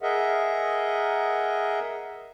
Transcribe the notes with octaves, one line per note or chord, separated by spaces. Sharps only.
G#4 A#4 D#5 E5 F#5